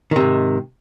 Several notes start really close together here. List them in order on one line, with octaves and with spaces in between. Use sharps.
D#3 C3 G#2